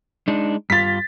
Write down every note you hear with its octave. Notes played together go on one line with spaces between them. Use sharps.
G#3 D4 D#4
G2 F4 A6 B6